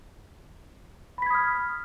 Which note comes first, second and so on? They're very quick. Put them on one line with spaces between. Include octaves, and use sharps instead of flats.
B5 B6 G#6 D#6 F6